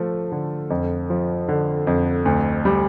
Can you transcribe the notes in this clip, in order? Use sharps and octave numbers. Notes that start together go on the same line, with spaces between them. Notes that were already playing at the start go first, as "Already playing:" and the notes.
Already playing: F3 A3
D3
F2
F3
D3
F2
D2
G3